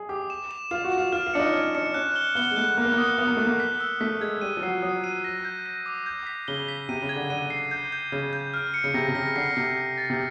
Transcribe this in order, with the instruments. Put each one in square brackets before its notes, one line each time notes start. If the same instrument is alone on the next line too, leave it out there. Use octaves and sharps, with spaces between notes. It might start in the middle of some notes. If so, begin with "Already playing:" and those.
Already playing: [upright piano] G#4
[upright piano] G4 [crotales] D6
[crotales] E7
E7
[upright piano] F4 [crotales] E7
[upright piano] F#4
[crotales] E7
[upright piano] F4
[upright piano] F4 [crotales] F6
[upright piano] F4
[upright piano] D4 [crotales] C#7
[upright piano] D#4
[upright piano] C#4 [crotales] F6
[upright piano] D4 [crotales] C#7
[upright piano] C#4 [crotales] F#6
[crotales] G7
[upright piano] B3 [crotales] G7
[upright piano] G#3
[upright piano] A3 [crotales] F#6
[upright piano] A#3 [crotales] F#6
[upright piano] B3
A#3
[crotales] D#6
[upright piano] B3 [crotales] D#6
[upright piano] A#3
[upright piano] A3 [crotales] F#6
[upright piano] A#3
[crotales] B6
E6
[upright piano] A3 [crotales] B6
[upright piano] G#3 [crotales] G#6
[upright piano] G3 [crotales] D#7
[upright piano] F3
[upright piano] F#3 [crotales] C7
[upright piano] F#3 [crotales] D#6
[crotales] D#7
A#6
G6
A#6
D6
G6
B6
[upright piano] C#3 [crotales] G7
[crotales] B6
[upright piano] C3 [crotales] D#7
[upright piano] C#3
[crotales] G#6
[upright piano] D3
[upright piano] D3 [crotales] D#7
[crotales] C7
G6
G6
[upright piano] C#3 [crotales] G6
[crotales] G6
F6
C#7
[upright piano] C#3
[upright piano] C3 [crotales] A#6
[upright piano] C3
[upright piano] C#3 [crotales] A#6
[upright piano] D3 [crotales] C7
[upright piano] C3 [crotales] C7
[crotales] C7
A6
[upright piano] C3